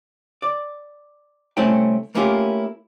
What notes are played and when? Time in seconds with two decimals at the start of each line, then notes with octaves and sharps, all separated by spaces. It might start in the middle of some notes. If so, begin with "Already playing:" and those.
0.42 D5
1.57 C2 A3 C4 C#4 E4 G5
2.15 A3 A#3 C#4 E4 F4 G4